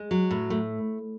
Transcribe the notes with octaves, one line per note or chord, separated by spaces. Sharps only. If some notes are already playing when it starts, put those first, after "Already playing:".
Already playing: G#3
F#3
A2
A3